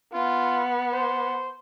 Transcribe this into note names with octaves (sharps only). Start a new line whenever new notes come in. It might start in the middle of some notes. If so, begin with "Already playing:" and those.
B3 F4
C5